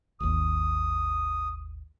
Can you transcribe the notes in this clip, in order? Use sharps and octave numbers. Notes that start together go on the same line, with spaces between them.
G#1 D#2 D#6